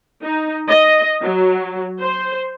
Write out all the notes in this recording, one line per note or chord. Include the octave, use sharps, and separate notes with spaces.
D#4
D#5
F#3
C5